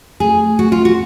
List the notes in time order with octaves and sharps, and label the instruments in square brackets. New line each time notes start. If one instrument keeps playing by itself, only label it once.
[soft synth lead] A3 [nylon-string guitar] G#4
[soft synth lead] A3 [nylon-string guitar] F#4
[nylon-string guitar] F4
F#4